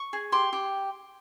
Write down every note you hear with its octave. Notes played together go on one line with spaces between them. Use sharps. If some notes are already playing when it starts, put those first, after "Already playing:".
Already playing: C#6
G#4
G4 C6
G4